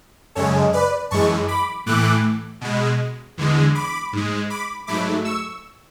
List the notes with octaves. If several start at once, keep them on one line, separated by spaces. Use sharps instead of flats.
F#2 C#3 G#3 A4 C#5
B4 D5
F#2 E3 G#3 A5 C#6
B5 D6
A2 E3 A3 D6 F#6
B2 G#3
E2 D3 G#3
B5 D6
G#2 G#3
B5 D6
G#2 F#3 A3 B5 D6
C#6 E6